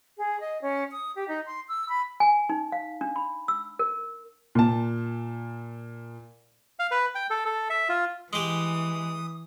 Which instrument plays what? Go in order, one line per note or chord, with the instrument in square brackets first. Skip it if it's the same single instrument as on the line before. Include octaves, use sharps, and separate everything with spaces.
[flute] G#4
D#5
C#4
D#6
G4
D#4
C6
E6
B5
[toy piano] G#5
D#4
F5
D4
B5
E6
A#4
[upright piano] A#2 A5
[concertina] F5
B4
G5
A4
A4
E5
F4
[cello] E3 [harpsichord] G#3 G4 [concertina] D#6